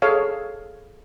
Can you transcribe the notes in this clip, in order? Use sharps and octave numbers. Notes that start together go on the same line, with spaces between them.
G#4 A4 C#5 F5